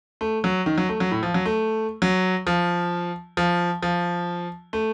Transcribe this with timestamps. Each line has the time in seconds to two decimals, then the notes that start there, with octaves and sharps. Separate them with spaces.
0.21 A3
0.44 F#3
0.66 D#3
0.78 F#3
0.89 A3
1.00 F#3
1.11 A2
1.23 F3
1.34 F#3
1.45 A3
2.02 F#3
2.47 F3
3.37 F3
3.82 F3
4.73 A3